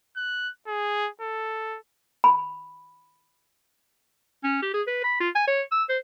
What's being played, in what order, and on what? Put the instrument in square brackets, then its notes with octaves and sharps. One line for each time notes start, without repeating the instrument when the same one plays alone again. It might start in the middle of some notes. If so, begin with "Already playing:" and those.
[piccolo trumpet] F#6
G#4
A4
[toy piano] B5
[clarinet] C#4
G4
G#4
B4
B5
F4
G#5
C#5
E6
C5